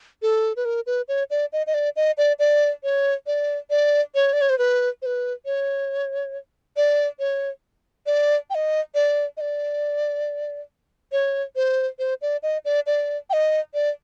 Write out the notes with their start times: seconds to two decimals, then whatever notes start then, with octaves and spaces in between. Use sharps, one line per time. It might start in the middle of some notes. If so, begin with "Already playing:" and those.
0.22 A4
0.56 B4
0.65 A#4
0.86 B4
1.08 C#5
1.30 D5
1.53 D#5
1.67 D#5
1.74 D5
1.96 D#5
2.18 D5
2.39 D5
2.83 C#5
3.27 D5
3.70 D5
4.15 C#5
4.33 D5
4.41 C#5
4.50 C5
4.58 B4
5.02 C5
5.06 B4
5.46 C#5
6.77 D5
7.19 C#5
8.06 D5
8.50 G5
8.55 D#5
8.95 D5
9.37 D#5
9.41 D5
11.12 C#5
11.56 C5
11.99 C5
12.22 D5
12.43 D#5
12.65 D5
12.86 D5
13.30 G5
13.33 D#5
13.74 D5